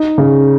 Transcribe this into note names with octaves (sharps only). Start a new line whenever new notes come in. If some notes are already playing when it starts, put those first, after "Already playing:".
Already playing: D#4
C#3